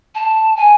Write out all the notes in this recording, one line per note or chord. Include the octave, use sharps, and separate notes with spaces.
A5
G#5